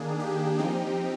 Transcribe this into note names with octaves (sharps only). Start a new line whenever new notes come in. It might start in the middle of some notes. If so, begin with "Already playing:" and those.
Already playing: D#3 A#3 D4 G#4
G4
F3 C4 D#4